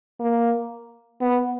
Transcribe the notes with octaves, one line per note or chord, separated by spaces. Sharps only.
A#3
B3